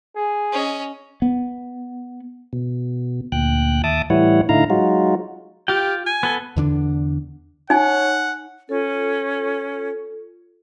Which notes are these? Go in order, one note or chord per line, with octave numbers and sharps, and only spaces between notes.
G#4
C#4 D#5
B3
B2
D2 A#2 G5 F#6
D#2 E5 A5 D6 D#6
A2 E3 G3 E4 C#5 F#5
A2 D3 D#4 E4 F5 A#5
F#3 G#3 D#4 F4 F#4
F4 G4 G5
G#5
B3 A4
E2 D3 D4
D#4 C#5 F#5 G#5
C#4 F4 A4